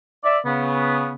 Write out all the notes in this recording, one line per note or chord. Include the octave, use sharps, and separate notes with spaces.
D5 E5
C#3 B3